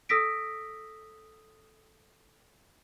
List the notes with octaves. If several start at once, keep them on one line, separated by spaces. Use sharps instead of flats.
A4 D#6 E6 A#6 B6 D7